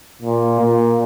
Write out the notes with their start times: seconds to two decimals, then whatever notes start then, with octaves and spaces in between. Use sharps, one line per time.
0.22 A#2
0.60 A#2